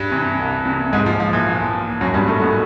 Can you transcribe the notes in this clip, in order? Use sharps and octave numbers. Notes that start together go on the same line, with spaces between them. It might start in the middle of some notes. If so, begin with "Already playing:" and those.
Already playing: G2 G3
C3 E3
C2
C3 E3
B1 G#2 G#3
F3
A#2 F3
E3
B1 F3
A#2
G#1 F#2 F#3
G2 G3
F#2 A2 D#3 A3
B2 B3